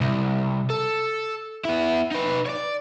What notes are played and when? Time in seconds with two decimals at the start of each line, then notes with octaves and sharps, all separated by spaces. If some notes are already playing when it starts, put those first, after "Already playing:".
0.01 C2
0.70 A4
1.65 B3 E4
2.11 D#4 B4
2.46 C#5 D5